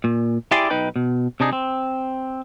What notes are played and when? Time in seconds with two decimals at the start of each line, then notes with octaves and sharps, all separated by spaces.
0.04 A#2
0.51 E4 G4 G#4 D5 G#5 C6
0.70 B1 D#4 B4 G5
0.96 B2
1.40 C3 D4 D#4 G#4
1.53 C4